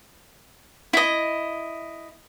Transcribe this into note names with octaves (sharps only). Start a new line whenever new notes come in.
E4 D#5